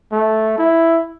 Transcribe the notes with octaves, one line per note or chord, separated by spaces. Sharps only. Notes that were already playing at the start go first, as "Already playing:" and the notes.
A3
E4